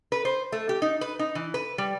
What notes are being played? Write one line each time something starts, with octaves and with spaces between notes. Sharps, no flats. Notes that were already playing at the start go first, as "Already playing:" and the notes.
B4
C5
A3
G4
D#4
B4
D#4
E3
B4
G3